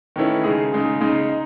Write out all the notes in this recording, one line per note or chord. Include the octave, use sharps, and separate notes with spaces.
D#3 A3 C#4 E4 B4
C#3 G#3 D#4 G#4
C#3 G#3 D#4 G#4
C#3 G#3 D#4
D#4